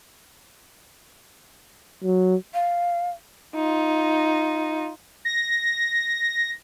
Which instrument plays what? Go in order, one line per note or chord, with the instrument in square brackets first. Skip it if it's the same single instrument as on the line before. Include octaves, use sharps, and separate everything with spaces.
[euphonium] F#3
[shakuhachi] F5
[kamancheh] D#4 F4
[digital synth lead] A#6